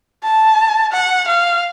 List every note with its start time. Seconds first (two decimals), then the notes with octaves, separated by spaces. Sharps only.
0.24 A5
0.93 F#5
1.28 F5